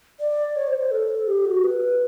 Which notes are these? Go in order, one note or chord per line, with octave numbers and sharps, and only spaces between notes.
D5
C#5
C5
C5
A4
G4
F#4
B4